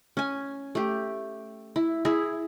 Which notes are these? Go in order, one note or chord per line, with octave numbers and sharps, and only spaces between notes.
C#4 G#5
A3 G4
E4
E4 G#4